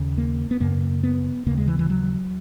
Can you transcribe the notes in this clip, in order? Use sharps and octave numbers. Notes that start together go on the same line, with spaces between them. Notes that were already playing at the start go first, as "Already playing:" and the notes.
Already playing: D#2 C#3
A#3
B3
F#2 C#3 A#3
B3
D#2 C#3 A#3
G#3
E3
E3
F#3